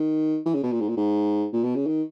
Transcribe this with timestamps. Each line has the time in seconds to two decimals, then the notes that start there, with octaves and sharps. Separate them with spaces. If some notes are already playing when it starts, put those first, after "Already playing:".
Already playing: D#3
0.46 E3
0.55 C#3
0.63 B2
0.72 A#2
0.81 G#2
0.89 A#2
0.97 G#2
1.53 A#2
1.64 B2
1.75 C#3
1.87 D#3